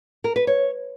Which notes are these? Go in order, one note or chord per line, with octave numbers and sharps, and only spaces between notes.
A#4
B4
C#5